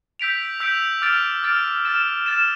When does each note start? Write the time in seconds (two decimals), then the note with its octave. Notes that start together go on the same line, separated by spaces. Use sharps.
0.19 E6 G6 B6 D7 F7
0.60 E6 G6 B6 D7 F7
1.02 D6 F6 A6 D7
1.43 D6 F6 A6 D7
1.85 F6 A6 E7
2.26 F6 A6 E7